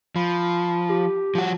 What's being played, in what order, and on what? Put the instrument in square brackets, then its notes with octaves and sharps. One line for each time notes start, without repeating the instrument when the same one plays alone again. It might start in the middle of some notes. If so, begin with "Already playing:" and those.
[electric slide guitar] F3 [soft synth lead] B5
[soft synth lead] G4
[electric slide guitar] F3 F#4